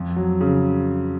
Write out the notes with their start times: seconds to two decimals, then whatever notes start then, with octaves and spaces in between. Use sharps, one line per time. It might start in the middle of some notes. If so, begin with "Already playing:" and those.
Already playing: F2
0.16 F#3
0.41 C#3